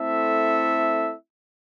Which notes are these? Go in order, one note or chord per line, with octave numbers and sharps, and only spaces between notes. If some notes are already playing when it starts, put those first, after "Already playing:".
Already playing: A3 C4 E4 A4 E5